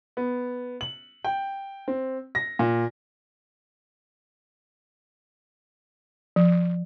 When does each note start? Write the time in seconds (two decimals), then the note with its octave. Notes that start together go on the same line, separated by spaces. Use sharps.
0.17 B3
0.81 F#7
1.25 G5
1.88 C4
2.35 A#6
2.59 A#2
6.36 F3